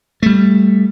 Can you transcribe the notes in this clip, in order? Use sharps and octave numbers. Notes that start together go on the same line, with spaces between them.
G3 A3